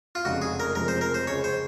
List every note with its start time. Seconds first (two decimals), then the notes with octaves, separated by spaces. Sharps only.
0.15 F4
0.25 F1 F2 C#3 G#3 D#4 F#4
0.42 G#4
0.60 A#4
0.75 F2 C3 F3 G#3 C4 A#4
0.88 C5
1.01 A#4
1.14 C5
1.27 C#2 C#3 G#3 C#5
1.44 C5